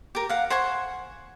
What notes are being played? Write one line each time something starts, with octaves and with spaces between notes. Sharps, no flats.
G4 A#4
F5 F#5
C5 F#5 G#5 C#6